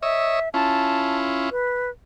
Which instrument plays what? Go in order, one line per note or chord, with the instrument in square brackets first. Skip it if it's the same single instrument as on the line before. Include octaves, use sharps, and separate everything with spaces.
[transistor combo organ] C#5 D#5 E6 [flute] E5
[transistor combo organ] C#4 E4 F4 [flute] A5
[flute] B4